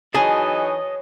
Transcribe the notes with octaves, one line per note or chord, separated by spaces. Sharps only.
E3 F#3 D#4 G#4 C#5 D#5 G#5 A5